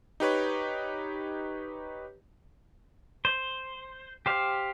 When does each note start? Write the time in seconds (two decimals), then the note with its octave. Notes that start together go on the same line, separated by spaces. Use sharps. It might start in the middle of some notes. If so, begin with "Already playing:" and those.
0.20 D#4 G4 B4 C#5
3.25 C5
4.26 G4 C5 F5